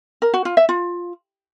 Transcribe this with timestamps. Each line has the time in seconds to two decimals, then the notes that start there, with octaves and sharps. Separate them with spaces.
0.22 A#4
0.34 F#4
0.45 F4
0.57 E5
0.69 F4